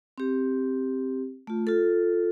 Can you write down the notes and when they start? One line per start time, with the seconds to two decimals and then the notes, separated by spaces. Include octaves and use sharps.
0.18 C4 G4
1.47 A3 F4
1.67 F4 A4